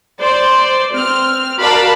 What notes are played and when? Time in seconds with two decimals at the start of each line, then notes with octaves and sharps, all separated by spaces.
0.20 C5 D5
0.93 C4 F6
1.61 F#4 A#4 D5 F5 A5 B5